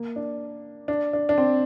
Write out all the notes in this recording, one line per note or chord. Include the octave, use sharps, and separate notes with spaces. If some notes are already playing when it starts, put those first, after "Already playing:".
Already playing: A#3
D4
D4
D4
D4
C4